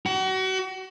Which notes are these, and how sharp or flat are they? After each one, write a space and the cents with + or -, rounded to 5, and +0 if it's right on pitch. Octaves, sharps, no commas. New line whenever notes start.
F#4 +35